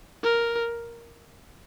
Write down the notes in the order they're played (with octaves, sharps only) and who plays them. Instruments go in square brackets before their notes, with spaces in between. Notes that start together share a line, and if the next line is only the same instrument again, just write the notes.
[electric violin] A#4